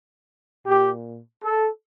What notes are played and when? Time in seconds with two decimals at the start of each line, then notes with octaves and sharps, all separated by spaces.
0.66 A#2 G4
1.43 A4